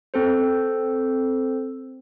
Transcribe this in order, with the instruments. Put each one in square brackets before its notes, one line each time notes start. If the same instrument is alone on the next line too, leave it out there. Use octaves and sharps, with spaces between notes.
[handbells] C4 A4 C5